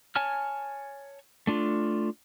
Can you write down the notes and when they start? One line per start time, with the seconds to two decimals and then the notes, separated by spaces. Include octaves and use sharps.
0.16 C#5 G#5 A5 F6
1.47 A3 D4 F4